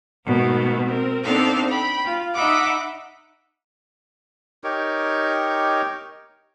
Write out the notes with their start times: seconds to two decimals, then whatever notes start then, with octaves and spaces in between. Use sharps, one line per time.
0.24 G#2 B2 D#3 A3
0.83 C4 A#4
1.23 B3 C4 D4 D#4 A4 F5
1.68 G5 B5
2.04 F4
2.34 D#4 D#5 E5 F#5 B5 D6
4.64 D#4 G4 A#4 C#5